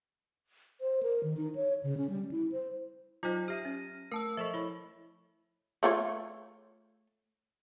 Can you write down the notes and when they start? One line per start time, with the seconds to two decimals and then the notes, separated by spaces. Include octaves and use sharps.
0.81 C5
1.03 A#4
1.23 D#3
1.37 D#4
1.55 C#5
1.83 C#3
1.98 C#4
2.10 G3
2.32 E4
2.52 C5
3.23 F#3 D#4 F4 C5 D#5
3.48 G4 E5 F6 A#6 D#7
3.65 C#4
4.12 A3 A#4 A5 E6
4.37 F3 A4 D#5 E5 C#6
4.54 E4 C#5 B5
5.83 A3 F4 C#5